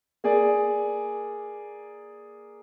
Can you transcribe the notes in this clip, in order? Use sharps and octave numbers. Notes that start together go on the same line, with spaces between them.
A#3 G#4 D5